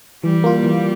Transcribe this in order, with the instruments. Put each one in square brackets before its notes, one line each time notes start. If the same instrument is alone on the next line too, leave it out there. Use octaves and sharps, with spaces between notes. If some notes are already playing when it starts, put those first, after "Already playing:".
[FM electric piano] E3 [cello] G3
[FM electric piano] A#3 F4
E3